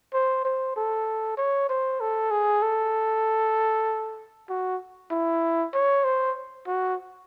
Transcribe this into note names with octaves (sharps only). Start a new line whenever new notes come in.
C5
C5
A4
C#5
C5
A4
G#4
A4
F#4
E4
C#5
C5
F#4